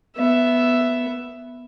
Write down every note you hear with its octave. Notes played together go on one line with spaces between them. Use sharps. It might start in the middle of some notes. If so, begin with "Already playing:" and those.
B3 E5